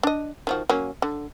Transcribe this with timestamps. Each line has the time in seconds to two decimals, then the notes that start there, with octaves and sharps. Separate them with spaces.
0.03 D4 D#5
0.47 D#3 F3 F#4
0.70 F#3 A#3 C#4
1.02 D3